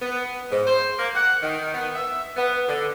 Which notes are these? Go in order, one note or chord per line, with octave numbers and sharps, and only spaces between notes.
B3
G#2
C5
A#3
F#5
D#3
B3
E5
B3
D3